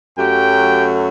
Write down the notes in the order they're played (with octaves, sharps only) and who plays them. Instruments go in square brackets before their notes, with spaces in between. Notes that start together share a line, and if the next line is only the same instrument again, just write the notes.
[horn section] F#2 F#3 A3 G4 G5